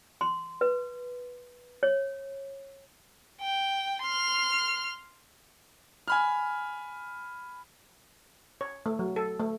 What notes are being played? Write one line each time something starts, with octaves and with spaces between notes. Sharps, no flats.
C6
B4
C#5
G5
C6 F6
G#5 B5 F6
C#5
A3
F#3
A4
A3